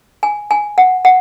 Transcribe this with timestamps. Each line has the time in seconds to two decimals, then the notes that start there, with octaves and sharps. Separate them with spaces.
0.23 G#5
0.51 G#5
0.78 F#5
1.05 F#5